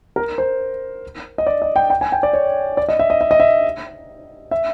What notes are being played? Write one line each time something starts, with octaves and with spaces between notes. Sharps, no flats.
A#4
C5
D#5
D5
D#5
G5
G5
G#5
G5
D5
C#5
D5
D#5
E5
D#5
E5
D#5
E5
E5